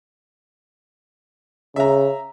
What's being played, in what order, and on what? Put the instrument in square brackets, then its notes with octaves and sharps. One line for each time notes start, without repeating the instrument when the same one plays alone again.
[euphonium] C#3 [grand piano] E5 A#5